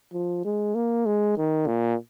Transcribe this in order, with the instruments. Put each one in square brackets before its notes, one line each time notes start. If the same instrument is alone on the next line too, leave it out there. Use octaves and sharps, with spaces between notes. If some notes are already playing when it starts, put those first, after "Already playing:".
[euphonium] F3
G#3
A#3
G#3
D#3
A#2